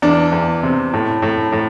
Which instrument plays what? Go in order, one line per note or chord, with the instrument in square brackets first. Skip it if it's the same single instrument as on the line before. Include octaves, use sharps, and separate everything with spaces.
[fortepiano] E2 D4
E2
C3
A2
A2
A2